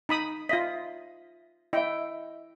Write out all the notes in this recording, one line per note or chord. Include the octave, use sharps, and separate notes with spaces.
D#4 B5 D#6
F4 D#5 E5 B6
E4 D#5 E5 G5